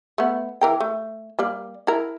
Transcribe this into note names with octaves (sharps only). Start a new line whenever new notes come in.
A3 B3
E3 A#4 G5
A3
G3 A#3 D5
E4 A#4